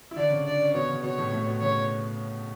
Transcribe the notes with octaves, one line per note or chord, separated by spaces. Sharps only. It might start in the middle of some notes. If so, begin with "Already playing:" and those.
E4
D3 D4 D5
C#3 C#4
D4 D5
C#4
B2 B3 C#5
C#3 C#4
B2 B3 C#5
A2 A3
A2 A3
B2 B3
C#3 C#4 C#5